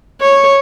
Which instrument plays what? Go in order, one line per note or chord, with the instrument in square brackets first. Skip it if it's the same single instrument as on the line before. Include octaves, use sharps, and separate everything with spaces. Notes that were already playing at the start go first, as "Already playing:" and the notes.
[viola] C#5